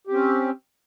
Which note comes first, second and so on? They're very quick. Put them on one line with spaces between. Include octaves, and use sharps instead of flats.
G4 C4 C#4